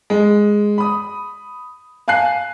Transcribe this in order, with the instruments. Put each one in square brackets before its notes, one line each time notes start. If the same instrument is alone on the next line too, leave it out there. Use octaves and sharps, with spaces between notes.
[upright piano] G#3
B5 D#6
F5 G#5 A5 F#6 C7